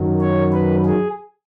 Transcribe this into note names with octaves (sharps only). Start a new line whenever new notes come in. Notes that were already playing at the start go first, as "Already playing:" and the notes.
Already playing: F#2 D#3 F#3
C#5
B4
G#4